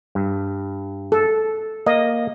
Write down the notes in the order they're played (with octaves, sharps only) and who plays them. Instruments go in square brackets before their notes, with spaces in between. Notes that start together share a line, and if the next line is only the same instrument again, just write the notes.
[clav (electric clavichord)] G2
[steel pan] A4
[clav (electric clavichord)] A#3 [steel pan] D#5